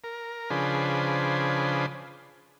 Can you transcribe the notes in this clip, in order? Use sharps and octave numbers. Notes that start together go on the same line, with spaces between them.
A#4
C#3 F3 D4 G#4 B4 C5